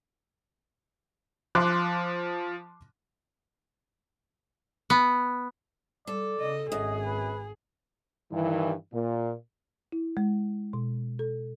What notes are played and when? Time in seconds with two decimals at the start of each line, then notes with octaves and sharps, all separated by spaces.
1.55 F3 C6 D6 F#6
4.90 B3
6.07 G3 A4 D5
6.40 C#3 D#5
6.72 G#1 F#2 G#4 D#5
7.06 B4
8.32 G2 D#3 E3
8.93 A#2
9.92 E4
10.17 G#3
10.73 B2
11.19 A4